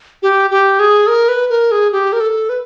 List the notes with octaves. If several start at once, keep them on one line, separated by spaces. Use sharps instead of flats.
G4
G4
G#4
A#4
B4
A#4
G#4
G4
A#4
A4
B4